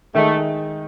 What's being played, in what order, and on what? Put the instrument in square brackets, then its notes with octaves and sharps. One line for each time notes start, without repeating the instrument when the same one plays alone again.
[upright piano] D#3 G#3 D#4 [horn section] A3